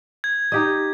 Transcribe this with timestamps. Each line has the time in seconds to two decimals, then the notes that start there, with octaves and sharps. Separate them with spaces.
0.24 G#6
0.52 D#4 G4 D#5